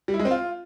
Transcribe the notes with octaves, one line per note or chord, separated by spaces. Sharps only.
G3
E4
G#3
C4
F4